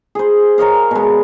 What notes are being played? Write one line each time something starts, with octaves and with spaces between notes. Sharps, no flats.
G#4 C5
A#4 C#5 D#5 F5
B2 G#3